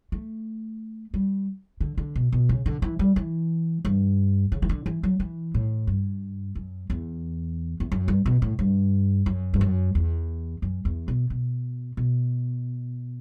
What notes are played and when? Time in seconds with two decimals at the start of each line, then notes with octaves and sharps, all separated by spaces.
0.12 A3
1.14 G3
1.81 D3
1.98 D3
2.16 B2
2.32 B2
2.49 C#3
2.66 D3
2.82 E3
2.99 G3
3.16 E3
3.85 G2
4.52 C#3
4.62 E3
4.69 D3
4.86 E3
5.03 F#3
5.20 E3
5.54 A2
5.87 G2
6.55 F#2
6.90 E2
7.80 E2
7.92 F#2
8.08 G2
8.26 B2
8.42 A2
8.59 G2
9.26 F#2
9.54 G2
9.61 F#2
9.95 E2
10.62 F#2
10.85 E2
11.08 B2
11.30 B2
11.97 B2